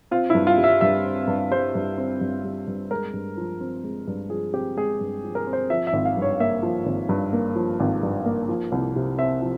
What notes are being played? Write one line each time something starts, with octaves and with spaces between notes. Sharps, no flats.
C4 F4
G2 E4
F4
G3
E5
G2 E5
C4
G2
G3 C5
G2
C4
G2
G3
G2
G#3 A#4
G2
F3
C4
G#3
G2
F3 G#4
C4 G4
G#3 G#4
G2
F3
A#4
C4
C5
F3 E5
E5
G#1
F5
G2
C#5
A#3 E5
F3
G#1
G2
A#3
F3
G#1
G2
A#3
F3
C2
C3
C4 E5
F3